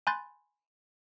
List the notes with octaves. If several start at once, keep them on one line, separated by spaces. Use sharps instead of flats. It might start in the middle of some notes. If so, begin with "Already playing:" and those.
G#5 B5 C6 F#6 G6 A6